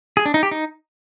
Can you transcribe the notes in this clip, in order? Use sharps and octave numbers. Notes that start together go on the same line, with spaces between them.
G#4
D4
D#4
G4
D#4